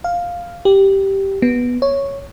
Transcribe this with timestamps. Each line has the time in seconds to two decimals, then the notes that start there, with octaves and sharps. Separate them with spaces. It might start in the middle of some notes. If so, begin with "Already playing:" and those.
0.04 F5
0.65 G4
1.42 B3
1.82 C#5